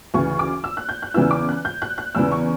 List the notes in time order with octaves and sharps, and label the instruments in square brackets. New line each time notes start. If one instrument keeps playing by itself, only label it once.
[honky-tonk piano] D2 C#3 E3 C#6
D6
E6
F#6
G6
F#6
E2 C#3 E3 B3 E4 E6
D6
F#6
G6
F#6
F#6
E2 C#3 E3 E6
C#6